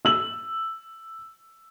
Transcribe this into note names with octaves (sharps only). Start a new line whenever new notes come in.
E6 F#7